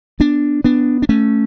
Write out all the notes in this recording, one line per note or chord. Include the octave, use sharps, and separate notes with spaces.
B3 D4
B3 D4
D4
A3 C#4